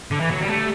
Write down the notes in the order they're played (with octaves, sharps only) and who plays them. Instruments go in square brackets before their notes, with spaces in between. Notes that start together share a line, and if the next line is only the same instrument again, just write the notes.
[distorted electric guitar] D3
E3
F#3
G3
[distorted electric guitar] A3 [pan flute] G4